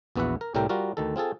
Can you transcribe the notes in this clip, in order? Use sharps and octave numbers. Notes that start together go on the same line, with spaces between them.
A#1 E2 B3 F#4 E5 F#5
A#4
C2 A2 G3 A3 A#4 G5
G3 F4 F#4 A#4
D2 D#3 A4
C4 F4 G#4 A4